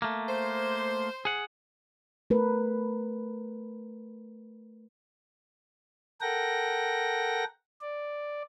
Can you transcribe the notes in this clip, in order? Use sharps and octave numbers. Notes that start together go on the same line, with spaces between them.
A3 A#3
C5
G#4 F#5
A3 A#4 B4
A4 A#4 F#5 G5 A#6
D5